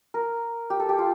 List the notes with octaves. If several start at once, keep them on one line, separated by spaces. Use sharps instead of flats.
A#4
G4
A4
G4
F4